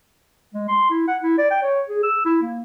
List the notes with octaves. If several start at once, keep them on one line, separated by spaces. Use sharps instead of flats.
G#3
C6
E4
F#5
E4
D5
G5
C#5
G#4
E6
E4
A#3